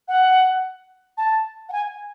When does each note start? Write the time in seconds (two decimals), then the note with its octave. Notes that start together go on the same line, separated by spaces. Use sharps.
0.08 F#5
1.17 A5
1.69 F#5
1.72 G#5